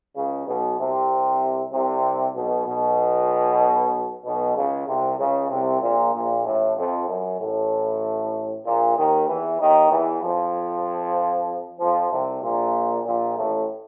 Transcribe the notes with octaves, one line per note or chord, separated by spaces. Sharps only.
C#2 C#3
B1 B2
C2 C3
C2 C3
B1 B2
B1 B2
B1 B2
C#2 C#3
C2 C3
C#2 C#3
C2 C3
A#1 A#2
A#1 A#2
A1 A2
F2
F#2
A1 A2
A#1 A#2
D#2 D#3
E2 E3
D#2 D#3
E2 E3
F2 F3
F2 F3
C2 C3
A#1 A#2
A#1 A#2
A1 A2